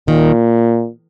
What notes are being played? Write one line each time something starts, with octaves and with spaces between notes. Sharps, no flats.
A#2 D#3